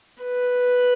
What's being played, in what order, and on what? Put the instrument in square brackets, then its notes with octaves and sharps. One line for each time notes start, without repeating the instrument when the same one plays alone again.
[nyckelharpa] B4